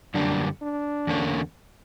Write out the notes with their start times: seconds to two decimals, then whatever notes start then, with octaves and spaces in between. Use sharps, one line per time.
0.14 F#2 D3 G3 A#3 D4
0.62 D4
1.07 E2 D3 A#3 C#4